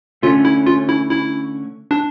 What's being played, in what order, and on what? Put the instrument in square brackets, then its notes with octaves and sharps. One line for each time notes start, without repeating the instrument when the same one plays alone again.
[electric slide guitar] D3 A3 C#4 [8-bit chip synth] F4
[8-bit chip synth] E4
F4
E4
E4
D4